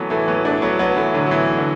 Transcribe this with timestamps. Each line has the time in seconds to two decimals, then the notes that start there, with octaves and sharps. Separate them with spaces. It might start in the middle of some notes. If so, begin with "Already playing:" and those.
Already playing: E3 F#3 A3 B3
0.10 E3 A3
0.28 F#3 B3
0.45 A3 D4
0.62 F#3 B3
0.79 F#3 B3
0.97 E3 A3
1.14 D3 F#3
1.27 F#3
1.31 E3
1.58 D3